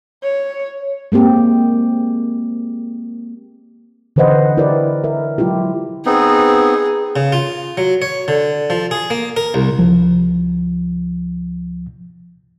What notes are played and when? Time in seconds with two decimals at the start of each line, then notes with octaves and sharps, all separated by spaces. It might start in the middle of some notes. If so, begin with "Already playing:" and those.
0.23 C#5
1.12 G#3 A#3 C4 G4
4.16 D3 E3 B4 C5 D#5 F#5
4.57 E4 G4 A#4 B4 D5
5.04 A#4 E5
5.38 F#3 G#3 E4 F4 G4
6.06 B3 C4 D#4 G#4
7.16 C#3
7.33 F4
7.77 F#3
8.02 C#5
8.28 D3
8.70 F3
8.91 G#4
9.10 A#3
9.37 A#4
9.54 C2
9.78 C#2 F3